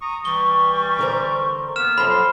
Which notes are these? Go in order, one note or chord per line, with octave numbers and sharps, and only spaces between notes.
A#5 C#6 D#6
E3 G3 C#6 G7
D3 A#4 C5
A#3 B3 F6 E7
F#2 F3 F#3 A4 B5 C6